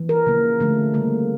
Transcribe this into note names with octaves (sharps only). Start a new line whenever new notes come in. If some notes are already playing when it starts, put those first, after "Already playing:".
Already playing: E3
A#4
C#3 F3 A#3
D3 F3 A3
C#3 G3 A#3